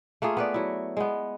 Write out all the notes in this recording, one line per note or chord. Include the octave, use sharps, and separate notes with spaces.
A3 A#3 F4 G#4
B3 B4 D5
F#3 E4
G#3 B3